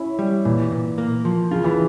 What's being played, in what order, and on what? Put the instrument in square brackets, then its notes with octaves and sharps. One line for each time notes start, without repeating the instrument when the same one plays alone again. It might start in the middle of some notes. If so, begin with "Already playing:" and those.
Already playing: [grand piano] C#4 E4
[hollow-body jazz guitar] G3
[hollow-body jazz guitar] A#2 [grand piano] E3
[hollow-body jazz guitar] A#2
A#3
F3
[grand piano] C#3 [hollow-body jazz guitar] F4
[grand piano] E3